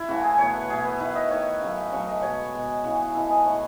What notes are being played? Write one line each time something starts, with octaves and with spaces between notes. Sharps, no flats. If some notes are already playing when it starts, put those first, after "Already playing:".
Already playing: E4
C#3 E3 A3 F#4
G#4
B2 A3 C#5
B4
B2 A3 G#4
B4
D#3 A3 B4
D#5
D#3 A3 C#5
C#3 F#3 A3
C#3 F#3 A3 C#5
D#5
B2 G#3 C#5
B2 G#3
C#3 E3 G#3 F#4
G#4
C#3 E3 G#3 A4
D#5
A2 E3 A3 C#5